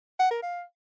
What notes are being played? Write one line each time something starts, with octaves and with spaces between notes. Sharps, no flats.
F#5
A#4
F5